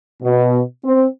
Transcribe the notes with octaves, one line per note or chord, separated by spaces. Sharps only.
B2
C4